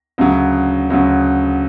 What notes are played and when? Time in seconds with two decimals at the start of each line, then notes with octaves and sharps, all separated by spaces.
0.18 D2 C#3 F#3
0.90 D2 C#3 F#3